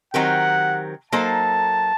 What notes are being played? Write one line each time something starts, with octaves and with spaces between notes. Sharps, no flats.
D#3 F#3 C4 G4 A#4 F#5
F#3 A#3 D#4 A4 C5 A5